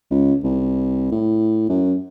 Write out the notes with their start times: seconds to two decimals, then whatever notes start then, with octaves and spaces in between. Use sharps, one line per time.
0.11 C#2
0.44 C2
1.12 A2
1.69 F#2